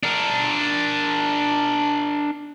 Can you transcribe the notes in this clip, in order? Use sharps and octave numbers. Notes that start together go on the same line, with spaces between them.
D4 A#4